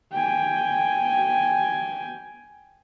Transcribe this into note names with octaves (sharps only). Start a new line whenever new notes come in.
G5 G#5